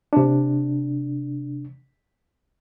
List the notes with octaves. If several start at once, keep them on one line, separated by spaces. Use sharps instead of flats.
C3 D4